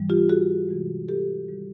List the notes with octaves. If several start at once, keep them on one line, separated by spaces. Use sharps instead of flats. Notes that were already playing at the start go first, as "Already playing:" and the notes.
Already playing: G#2 E3 G3
F4 G4
F#4 G#4
C3 E3 G#3
G4 A4
D#3 G3